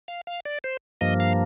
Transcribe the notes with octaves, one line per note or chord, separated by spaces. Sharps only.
F5
F5
D5
C5
G2 F3 A#3 D#5
F5